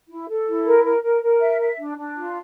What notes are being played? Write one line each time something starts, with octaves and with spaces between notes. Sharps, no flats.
E4
A4
E4
A#4
A#4
A#4
A#4
E5
E5
D4
D4
F4